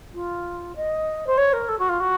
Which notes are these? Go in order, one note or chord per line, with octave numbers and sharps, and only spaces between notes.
F4
D#5
C5
C#5
A#4
A4
F#4
F4
F#4